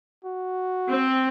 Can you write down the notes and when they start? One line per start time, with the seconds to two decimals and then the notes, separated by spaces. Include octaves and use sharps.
0.25 F#4
0.89 C4